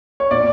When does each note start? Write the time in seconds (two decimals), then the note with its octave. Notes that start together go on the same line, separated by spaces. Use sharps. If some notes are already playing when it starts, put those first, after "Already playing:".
0.20 C#5
0.31 A#2 D5